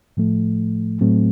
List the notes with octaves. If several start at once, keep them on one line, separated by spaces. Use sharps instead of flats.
A2 F3 A3
A2 F#3 A3 C4